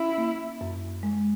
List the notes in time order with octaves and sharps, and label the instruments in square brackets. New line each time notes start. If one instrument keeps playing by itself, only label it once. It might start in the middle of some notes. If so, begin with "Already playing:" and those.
Already playing: [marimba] C#4 [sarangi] E4
[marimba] A#3
F#2
G#3